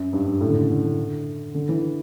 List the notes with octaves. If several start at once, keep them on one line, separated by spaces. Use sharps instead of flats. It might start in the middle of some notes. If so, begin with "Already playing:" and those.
Already playing: F#2
G2
G2
A2
D3
C#3
D3
D3
D3
E3